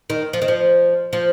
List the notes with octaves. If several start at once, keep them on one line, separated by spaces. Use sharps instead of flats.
D#3
F3
D#3
F3
F3